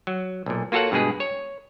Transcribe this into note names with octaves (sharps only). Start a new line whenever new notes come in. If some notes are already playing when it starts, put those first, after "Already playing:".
F#3
B1 A#2
A#3 F4 F#4 A4 C#5 F#5
G2 B2 G#3 G#4 B4
C#5